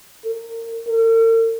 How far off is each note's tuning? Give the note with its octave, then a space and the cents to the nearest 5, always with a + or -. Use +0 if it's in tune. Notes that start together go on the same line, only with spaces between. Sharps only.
A#4 -30
A#4 -45